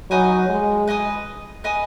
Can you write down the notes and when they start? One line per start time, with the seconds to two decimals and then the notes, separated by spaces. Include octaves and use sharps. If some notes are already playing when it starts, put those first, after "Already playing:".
0.10 F#3 D#4 B4 G#5 D#6
0.49 G#3
0.87 B4 D#5 G#5 D#6
1.64 B4 D#5 G#5 D#6